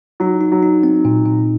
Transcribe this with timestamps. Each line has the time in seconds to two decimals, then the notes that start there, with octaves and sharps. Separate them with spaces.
0.20 F#3 D#4
0.41 D#4
0.52 F#3
0.63 D#4
0.83 C4
1.05 A#2
1.25 A#2